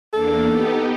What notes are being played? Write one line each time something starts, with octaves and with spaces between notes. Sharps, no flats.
E2 A#3 D4 A4
B3 D#4 G4